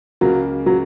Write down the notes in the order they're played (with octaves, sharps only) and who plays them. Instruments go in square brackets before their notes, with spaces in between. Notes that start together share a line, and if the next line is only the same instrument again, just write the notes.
[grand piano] C#2 C#3 A#3 [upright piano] F#3
[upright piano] F#3